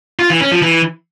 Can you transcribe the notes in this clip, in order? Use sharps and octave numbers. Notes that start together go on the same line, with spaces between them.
F4
E3
C#4
F3
E3